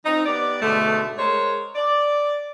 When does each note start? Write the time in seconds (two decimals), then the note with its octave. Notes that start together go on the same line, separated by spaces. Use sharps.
0.05 F3 C4 D#4
0.26 B3 G4 D5
0.62 G#2 B2 D3 A3
1.18 G#3 A#4 C5 C#5
1.75 D5